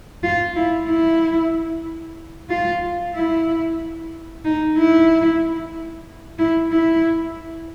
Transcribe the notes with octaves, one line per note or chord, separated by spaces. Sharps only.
F4
E4
E4
F4
E4
D#4
E4
E4
E4